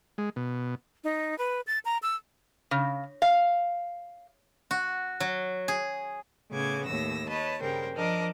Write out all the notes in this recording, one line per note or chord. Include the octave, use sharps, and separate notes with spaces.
G#3
B2
D#4
B4
A6
A#5
E6
C#3
F5
F#4
F#3
G#4
A2 C#3 B3 D6 G#6
D#2 A2 E6 A#6
B4 C#5 D#5 A5
G2 C#3 G3 A#4 C5 G5
F3 D4 A#4 D#5 D6